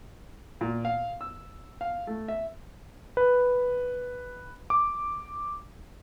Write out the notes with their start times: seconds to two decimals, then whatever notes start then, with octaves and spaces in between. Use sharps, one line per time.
0.61 A#2
0.85 F5
1.21 E6
1.81 F5
2.07 A3
2.28 E5
3.17 B4
4.70 D6